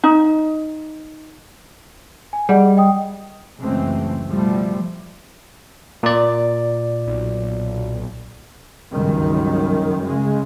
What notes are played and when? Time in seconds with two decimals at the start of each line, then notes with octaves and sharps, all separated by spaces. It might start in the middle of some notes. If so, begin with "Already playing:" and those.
0.04 D#4
2.33 G#5
2.49 G3 G#4 D#5 F#5
2.77 D#5 G5 D#6
3.61 F#1 C#2 E3 G#3 A3 C4
4.29 B2 F3 G3 A3
6.03 A#2 D5
7.07 B1
8.91 G1 C#2 F#2 D#3
10.06 C#3 G#3